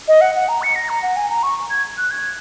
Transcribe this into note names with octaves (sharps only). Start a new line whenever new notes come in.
D#5
F#5
F#5
A#5
C#7
A#6
A#5
F#5
G#5
A#5
C#6
G#6
F#6
G#6